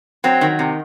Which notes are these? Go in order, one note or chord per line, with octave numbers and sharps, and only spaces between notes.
F#3 C4
D#3
C3